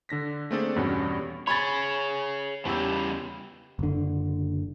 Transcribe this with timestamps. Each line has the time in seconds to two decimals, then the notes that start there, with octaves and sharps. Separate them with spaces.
0.09 D3 D4 A#6 B6
0.51 A3 A#3 C4 D4 G#4 A4
0.76 E2 G2 B2 G3 C#4
1.47 G#4 C#5 B5 G#6 A6
2.65 E2 C#3 G3 G4 E6
3.79 F#1 D3